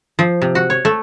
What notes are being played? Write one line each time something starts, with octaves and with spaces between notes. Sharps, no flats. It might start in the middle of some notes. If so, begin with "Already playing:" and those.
F3
C3
F#4
C#5
A3